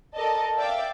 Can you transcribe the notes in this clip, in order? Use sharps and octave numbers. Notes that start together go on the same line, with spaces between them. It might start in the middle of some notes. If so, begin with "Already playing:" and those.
A4 A#4 D5 D#5 A5
D5 E5 F5 G5 D6